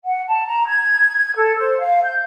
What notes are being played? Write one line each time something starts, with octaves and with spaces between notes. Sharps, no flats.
F#5
A5
A#5
G#6
A4
C5
F5
G6